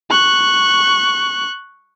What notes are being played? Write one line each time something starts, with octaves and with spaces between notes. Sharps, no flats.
C#6 F#6